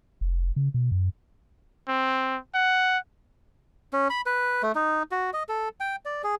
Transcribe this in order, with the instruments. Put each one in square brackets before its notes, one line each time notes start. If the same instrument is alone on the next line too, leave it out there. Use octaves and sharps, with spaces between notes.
[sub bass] F1
C#3
B2
F#2
[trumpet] C4
F#5
[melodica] C#4
B5
B4
A3
D#4
F#4
D#5
A4
G5
D5
G#4